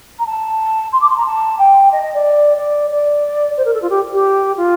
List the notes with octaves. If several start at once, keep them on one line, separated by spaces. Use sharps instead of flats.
A#5
A5
C6
D6
C6
A#5
A5
G5
D#5
D#5
D5
D5
D5
C5
A#4
A4
F4
G4
G4
F4